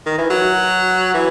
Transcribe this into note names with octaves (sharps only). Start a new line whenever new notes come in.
D#3
E3
F#3
E3